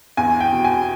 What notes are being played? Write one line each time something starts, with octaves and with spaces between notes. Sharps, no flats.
E2 G#5
G5
B2
G#5